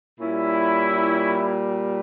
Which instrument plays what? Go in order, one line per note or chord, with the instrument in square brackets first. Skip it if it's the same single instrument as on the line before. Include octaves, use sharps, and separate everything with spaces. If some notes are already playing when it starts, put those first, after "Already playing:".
[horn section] A#2 G3 C#4 E4